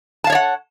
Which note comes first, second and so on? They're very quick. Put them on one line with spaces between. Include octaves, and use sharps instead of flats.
A5 F5 C#5 D5 F#5